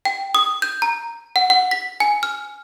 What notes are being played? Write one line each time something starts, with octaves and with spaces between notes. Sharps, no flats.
G5
D#6
G6
A#5
F#5
F#5
B6
G#5
F6